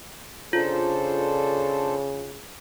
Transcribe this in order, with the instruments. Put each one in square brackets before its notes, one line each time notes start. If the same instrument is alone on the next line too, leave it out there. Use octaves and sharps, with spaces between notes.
[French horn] C#3 [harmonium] D4 A4 C5 [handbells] F4